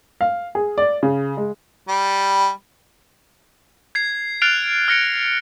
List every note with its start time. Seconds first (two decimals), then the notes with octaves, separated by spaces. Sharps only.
0.21 F5
0.55 G#4
0.78 D5
1.03 C#3
1.37 G#3
1.88 G3
3.95 G#6 C7
4.42 F6 F#6 A6 C7 D7 F7
4.88 F6 A#6 C#7 D7